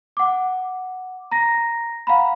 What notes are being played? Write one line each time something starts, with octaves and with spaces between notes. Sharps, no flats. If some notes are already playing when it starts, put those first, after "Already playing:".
F#5 D6
A#5 A#6
F5 F#5 A#5 B5